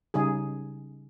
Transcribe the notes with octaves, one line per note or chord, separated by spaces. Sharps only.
C#3 G3 D#4 G#4